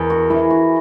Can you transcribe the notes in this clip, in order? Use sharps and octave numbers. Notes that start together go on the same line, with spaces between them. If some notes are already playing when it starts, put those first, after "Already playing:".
Already playing: E2 G#4 A#4
F#4
E3 E4
F#4